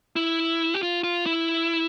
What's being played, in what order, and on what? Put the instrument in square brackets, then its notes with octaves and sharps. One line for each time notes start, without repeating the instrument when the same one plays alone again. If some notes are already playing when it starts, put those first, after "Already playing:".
[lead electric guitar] E4
G4
F4
F4
E4